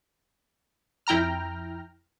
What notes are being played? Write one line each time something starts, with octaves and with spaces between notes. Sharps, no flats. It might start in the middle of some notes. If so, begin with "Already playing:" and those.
F2 E4 G5 A#5 F6